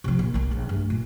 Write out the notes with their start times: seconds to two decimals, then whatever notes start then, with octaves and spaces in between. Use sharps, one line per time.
0.04 C3 F3
0.19 A#2
0.34 B1 A#3
0.51 A#1
0.69 G2 A3
0.90 A#2